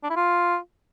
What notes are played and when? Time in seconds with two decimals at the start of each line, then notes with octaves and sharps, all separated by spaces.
0.03 D4
0.10 E4
0.16 F4